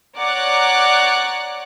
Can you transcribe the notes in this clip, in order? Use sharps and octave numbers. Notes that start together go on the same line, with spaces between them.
C#5 D5 F#5 A#5 D6 F#6